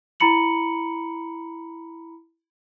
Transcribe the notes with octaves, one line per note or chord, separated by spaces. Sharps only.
E4 A#5 B5 C#7 F#7